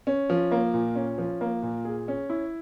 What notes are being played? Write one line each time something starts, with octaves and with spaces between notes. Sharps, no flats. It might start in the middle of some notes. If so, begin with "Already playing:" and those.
C#4
F3
A#3
A#2
C#4
F3
A#3
A#2
G#4
C#4
E4